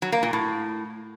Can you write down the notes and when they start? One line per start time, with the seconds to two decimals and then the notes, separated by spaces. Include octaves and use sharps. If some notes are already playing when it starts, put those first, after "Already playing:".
0.02 F#3
0.12 A#3
0.23 A#2
0.33 A2